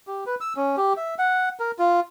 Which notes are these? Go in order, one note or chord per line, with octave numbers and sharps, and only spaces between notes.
G4
B4
E6
C#4
G4
E5
F#5
A#4
F4